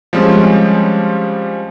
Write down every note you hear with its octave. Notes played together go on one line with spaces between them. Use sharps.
F3 G3 G#3 C4 C#4